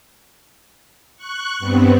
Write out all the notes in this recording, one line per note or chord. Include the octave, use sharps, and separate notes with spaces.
C#6 F#6
G2 B3 C4